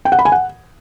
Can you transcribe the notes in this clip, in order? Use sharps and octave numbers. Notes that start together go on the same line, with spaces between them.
G5
F#5
B5
G#5
F#5